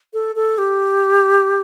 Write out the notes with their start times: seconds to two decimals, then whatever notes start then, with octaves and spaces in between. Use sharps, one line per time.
0.13 A4
0.36 A4
0.58 G4